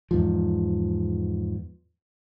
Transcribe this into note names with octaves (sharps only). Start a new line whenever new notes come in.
E2 G#2 F3